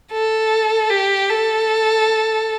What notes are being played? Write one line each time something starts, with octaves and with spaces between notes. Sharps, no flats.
A4
G4
A4